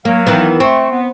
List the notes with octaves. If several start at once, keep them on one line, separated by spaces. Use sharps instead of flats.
F#3 A#3 F5
D#3 E3 B3
A3 C4 C#6
B3